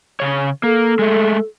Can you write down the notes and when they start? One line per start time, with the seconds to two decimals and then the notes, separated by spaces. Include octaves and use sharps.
0.20 C#3 C#5
0.63 A#3 A4
0.99 G#3 A3